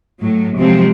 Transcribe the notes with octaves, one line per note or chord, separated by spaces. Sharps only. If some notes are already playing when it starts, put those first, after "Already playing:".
A2 F#3
C3 F3 F#3 G#3 C4